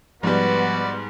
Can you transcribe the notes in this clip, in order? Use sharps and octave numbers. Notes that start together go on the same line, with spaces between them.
G#2 F3 G3 B3 F#4 D5 B5